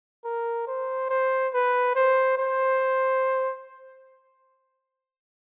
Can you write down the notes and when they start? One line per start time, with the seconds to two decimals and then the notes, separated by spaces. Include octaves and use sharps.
0.24 A#4
0.67 C5
1.10 C5
1.54 B4
1.96 C5
2.38 C5